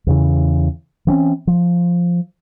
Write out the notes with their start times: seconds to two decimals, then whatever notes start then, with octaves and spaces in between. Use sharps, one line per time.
0.07 E2 C#3 E3
1.07 E3 C4 C#4
1.47 F3